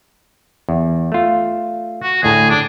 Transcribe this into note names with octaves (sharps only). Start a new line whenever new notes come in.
E2
A3 F4
F#4
D2 A2 G#4 A5
D4